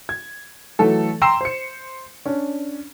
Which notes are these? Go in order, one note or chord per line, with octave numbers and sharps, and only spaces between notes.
G#6
E3 F#3 A3 A4
G5 A#5 C6 E6 C7 E7
C5 C#7
C#4 D4